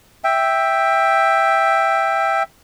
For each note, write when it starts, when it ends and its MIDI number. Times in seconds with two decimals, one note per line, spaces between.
0.24 2.43 76
0.24 2.43 79